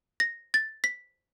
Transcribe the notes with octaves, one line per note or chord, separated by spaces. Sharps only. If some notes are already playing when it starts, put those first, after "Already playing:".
A#6
A6
B6